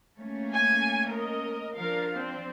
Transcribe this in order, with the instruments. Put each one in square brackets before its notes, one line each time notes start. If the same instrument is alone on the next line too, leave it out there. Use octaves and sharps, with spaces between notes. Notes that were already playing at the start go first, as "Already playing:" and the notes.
[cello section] A3 A#3 C#4
[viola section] G#5
A#4 D#5
[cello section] F3 D4 [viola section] A#4 F5
[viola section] C4